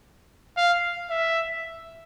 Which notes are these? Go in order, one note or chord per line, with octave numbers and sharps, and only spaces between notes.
F5
E5